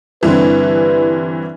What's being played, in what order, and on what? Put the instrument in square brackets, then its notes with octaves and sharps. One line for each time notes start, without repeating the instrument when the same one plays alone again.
[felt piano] G2 D3 C4 [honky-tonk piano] E3 [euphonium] B4